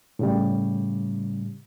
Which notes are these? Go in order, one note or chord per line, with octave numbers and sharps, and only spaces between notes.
A2 C#3 G3